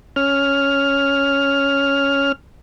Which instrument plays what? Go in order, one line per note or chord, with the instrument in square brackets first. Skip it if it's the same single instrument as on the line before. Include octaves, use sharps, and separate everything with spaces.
[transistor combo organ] C#4 F6